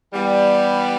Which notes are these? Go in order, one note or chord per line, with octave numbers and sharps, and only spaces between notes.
E3 G3 B3